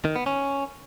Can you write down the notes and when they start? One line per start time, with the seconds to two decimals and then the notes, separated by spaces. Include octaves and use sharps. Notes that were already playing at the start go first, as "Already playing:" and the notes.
0.05 D#3
0.16 B3
0.26 C#4